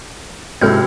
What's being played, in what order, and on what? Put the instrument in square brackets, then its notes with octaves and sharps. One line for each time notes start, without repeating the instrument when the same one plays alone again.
[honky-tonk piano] C#2 [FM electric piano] G#2 E4 [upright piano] C3 F#3 [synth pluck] A4 F6 G6